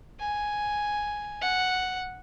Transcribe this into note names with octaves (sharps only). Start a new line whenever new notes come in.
G#5
F#5